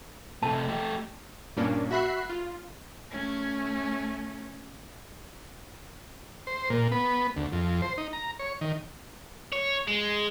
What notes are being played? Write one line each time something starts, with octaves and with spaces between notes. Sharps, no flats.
C3 A3 A5
A3 G4
G2 A#2 A#3 C#4 D4
F#4 E5 B5 F#6 C7
F4
A3 C#4
C5
A#2
B3
D2
F2
C5
D#4
A#5
C#5
D#3
C#5
G#3